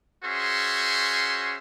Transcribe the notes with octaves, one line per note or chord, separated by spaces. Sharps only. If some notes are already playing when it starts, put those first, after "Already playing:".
C#4 F#4 G#4 C5 E5 C6